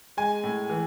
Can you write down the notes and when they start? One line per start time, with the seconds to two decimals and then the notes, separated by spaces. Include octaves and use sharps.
0.17 G#3 G#5
0.44 A2
0.70 E3